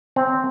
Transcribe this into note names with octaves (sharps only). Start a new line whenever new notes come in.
C4